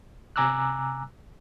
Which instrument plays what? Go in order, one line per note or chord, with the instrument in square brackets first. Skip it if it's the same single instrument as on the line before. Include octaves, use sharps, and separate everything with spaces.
[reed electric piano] C3 G#5 A#5 D6 E6 F#6